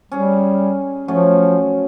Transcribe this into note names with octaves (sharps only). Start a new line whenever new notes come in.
G3 C#4 G#4
F3 F#3 A3 C#4